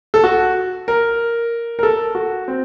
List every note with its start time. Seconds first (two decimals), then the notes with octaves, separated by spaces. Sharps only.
0.14 A4
0.24 F#4
0.88 A#4
1.79 A#4
1.83 A4
2.15 F#4
2.48 C4